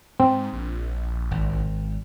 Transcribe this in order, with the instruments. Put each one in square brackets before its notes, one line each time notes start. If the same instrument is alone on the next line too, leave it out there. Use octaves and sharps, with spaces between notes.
[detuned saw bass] G#2 [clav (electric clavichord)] C4
[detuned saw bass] A#1
[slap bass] G#1